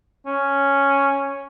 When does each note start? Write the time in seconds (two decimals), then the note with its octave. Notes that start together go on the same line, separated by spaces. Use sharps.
0.26 C#4